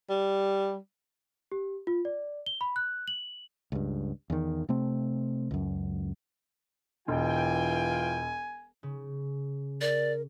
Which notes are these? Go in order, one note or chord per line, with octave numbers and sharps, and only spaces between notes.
G3
G4
F4
D5
G7
B5
F#6
F#7
C#2 G2
E2 D#3
C3 A3 C4
C#2 F#2
E1 E3 F4 G5 G#5
C#3
A#4 D5